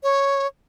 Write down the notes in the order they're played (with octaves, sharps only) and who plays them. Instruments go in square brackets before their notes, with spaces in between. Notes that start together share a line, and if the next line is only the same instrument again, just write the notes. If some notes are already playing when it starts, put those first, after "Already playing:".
[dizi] C#5